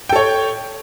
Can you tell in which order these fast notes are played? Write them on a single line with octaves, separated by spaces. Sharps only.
G5 A4 C#5